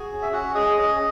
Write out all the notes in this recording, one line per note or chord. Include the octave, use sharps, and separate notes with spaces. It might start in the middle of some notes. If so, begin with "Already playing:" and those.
Already playing: F#4 G#4 G#5
C#4
E5
C#4 F#4 F#5
G#4 D#5 D#6
C#4 D#5 D#6